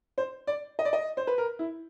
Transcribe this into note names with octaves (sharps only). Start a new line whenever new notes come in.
C5
D5
D#5
D5
D#5
C5
B4
A#4
E4